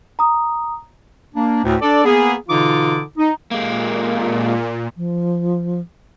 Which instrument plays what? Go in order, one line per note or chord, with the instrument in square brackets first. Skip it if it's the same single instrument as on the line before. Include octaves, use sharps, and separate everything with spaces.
[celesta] A#5 D#6
[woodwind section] A#3 D4
D2 A2
D4 A4 D5
A#3 B3 G#4
B2 D3 E3 D#4 F4 D6
D#4
[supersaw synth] A#2 [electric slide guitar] G#3 A#3
[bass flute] F3